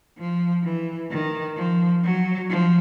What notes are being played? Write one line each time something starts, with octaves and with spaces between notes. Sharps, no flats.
F3
E3
D#3
F3
F#3
F3